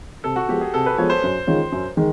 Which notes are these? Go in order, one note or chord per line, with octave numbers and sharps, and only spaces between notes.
C3 A4
F#4
F3 G#3 B3 G4
G#4
C3 A4
B4
F3 G#3 B3 C#5
C5
F#2
D#3 G#3 C#4 F4
F#2
D#3 G#3